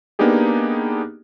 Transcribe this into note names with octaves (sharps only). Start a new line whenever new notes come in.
A#3 B3 D4 D#4 G4 G#4